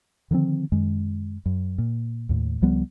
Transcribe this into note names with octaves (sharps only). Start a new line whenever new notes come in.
D3 D#3 F3 C4
F#2 D#3 G#3
F#2
A#2
D#2 A2
C#2 F3 G3 B3